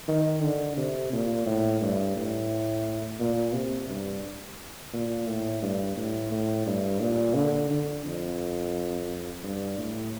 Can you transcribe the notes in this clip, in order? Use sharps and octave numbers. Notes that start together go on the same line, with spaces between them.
D#3
D3
C3
A#2
A2
G2
A2
A#2
C3
G2
A#2
A2
G2
A2
A2
G2
A#2
D3
D3
F2
G2
A2